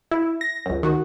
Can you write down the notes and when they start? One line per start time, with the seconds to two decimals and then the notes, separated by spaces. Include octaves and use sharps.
0.11 E4
0.41 A#6
0.66 C#2 F#2
0.83 D#3 F#4